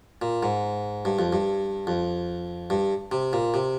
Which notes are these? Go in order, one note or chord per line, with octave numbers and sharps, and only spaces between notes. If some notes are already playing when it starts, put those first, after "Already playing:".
A#2
G#2
G2
F2
G2
F2
G2
C3
A#2
C3